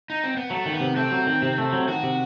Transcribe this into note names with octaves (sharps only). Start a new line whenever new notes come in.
D#4
C4
B3
F#3 A3
D#3
B3
C3
A3 C4
F#3
D#3
C3
A3
F#3
D#3 F#4
C3